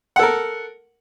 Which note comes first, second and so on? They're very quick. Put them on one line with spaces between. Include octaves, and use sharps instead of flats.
F#5 A4 A#4